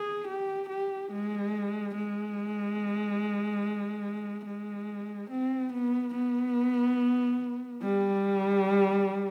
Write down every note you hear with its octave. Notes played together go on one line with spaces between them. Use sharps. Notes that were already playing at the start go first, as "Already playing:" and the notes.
Already playing: G#4
G4
G4
G#3
G#3
G#3
C4
B3
B3
G3